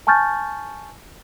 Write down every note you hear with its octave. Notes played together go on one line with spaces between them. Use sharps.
G#5 A5 C#6 F6 G6 A6